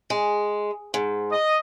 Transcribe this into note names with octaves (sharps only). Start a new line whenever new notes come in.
G#3
G#2
D#5